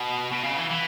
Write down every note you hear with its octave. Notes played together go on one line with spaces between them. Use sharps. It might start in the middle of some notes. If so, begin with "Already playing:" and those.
Already playing: B2
B2
C#3
E3
E3